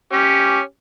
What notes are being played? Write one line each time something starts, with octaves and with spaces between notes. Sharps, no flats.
C#4 G4